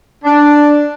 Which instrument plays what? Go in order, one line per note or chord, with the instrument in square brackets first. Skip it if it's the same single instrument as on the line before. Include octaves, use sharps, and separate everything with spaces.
[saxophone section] D4